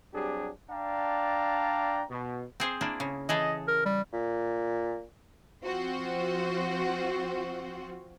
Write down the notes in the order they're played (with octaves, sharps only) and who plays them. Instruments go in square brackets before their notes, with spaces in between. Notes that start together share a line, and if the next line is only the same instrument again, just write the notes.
[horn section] F#3 G3 C4 D4 G4 G#4
D4 D5 F5 G5 A5 A#5
B2
[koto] C4 G#4 C5
A#3 D4 E4
C#3
[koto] E3 G#4 A4 [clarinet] D#5
[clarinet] A#4
G3
[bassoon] A#2
[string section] F3 C4 F4 F#4 C5